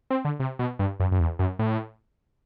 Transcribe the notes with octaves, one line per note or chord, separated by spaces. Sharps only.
C4
D3
C3
B2
G2
F#2
F#2
E2
F#2
A2